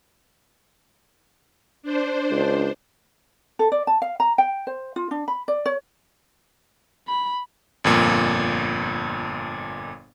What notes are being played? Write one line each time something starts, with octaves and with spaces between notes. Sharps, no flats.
D4 C5
C#2
A4
D5
A5
F5
A#5
G5
C5
F4
D4
B5
D5
C#5
B5
G1 F2 A#2